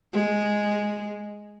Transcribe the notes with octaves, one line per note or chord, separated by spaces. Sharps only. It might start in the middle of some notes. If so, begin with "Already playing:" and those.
G#3